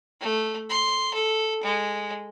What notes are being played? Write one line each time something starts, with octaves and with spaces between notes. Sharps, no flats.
A3
C6
A4
G#3